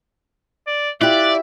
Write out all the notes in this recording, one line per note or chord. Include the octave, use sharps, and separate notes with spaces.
D5
E4 F4 G4 D5 E5 F#6